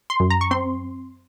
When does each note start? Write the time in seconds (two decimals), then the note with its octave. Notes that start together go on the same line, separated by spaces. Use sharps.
0.10 C6
0.20 F#2
0.30 A#5
0.41 C#6
0.51 C4 C6